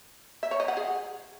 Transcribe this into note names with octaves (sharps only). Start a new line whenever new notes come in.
E5
C#5
D#5
F#5
G#4